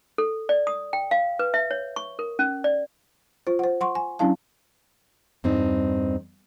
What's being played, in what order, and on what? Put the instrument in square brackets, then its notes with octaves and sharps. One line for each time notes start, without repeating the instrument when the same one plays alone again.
[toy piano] A4
D5
D#6
G5
F5
B4
E5
C#5
C#6
A#4
C#4
D5
[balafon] F4 C5
C5 F#5
F#5 C6 C#6
G#5
F#3 C#4 D4 E4 F5 A5
[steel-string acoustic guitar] E2 G2 C4 D#4